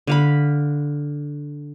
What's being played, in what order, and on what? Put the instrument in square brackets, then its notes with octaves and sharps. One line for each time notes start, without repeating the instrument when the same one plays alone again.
[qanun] D3 F5 B5